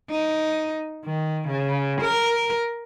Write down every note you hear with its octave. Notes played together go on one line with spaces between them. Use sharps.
D#4
D#3
C#3
A#4